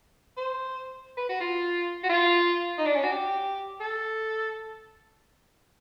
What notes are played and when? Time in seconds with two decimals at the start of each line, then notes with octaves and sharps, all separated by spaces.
0.37 C5
1.17 B4
1.29 F#4
1.41 F4
2.03 F#4
2.09 F4
2.78 D#4
2.86 D4
2.95 C#4
3.04 F#4
3.12 G4
3.80 A4